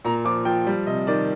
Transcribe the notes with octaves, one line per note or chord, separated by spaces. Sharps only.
A#2 A#5
F3 D6
F3 G5
G3
C3 D#5
D#3 D5